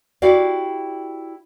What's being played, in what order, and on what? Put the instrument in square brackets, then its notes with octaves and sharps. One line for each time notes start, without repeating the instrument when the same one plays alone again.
[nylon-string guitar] E4 F#4 G4 D5 F5